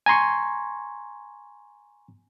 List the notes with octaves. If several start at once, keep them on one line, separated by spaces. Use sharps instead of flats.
G#5 A#5 C6 C#6